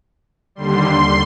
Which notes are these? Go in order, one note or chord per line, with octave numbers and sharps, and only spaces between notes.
D#2 D3 G3 C6